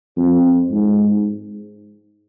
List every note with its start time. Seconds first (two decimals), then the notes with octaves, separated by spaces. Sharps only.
0.17 F2
0.71 G#2